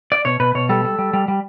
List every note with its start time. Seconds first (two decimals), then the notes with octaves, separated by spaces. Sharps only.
0.12 D5
0.25 B2 C#5
0.40 B2 B4
0.55 B2 C#5
0.69 G3 A4
0.84 G3
0.99 G3
1.13 G3
1.28 G3